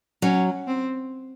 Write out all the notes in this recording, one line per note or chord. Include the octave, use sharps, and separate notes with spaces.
F#3 C#4
C4